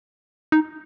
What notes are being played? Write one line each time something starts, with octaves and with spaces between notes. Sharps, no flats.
D#4